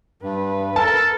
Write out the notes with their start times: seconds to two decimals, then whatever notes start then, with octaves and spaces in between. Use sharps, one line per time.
0.22 G2 B4
0.76 A4 A#4 A5